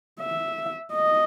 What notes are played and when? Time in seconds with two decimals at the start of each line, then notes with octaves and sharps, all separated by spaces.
0.20 E5
0.93 D#5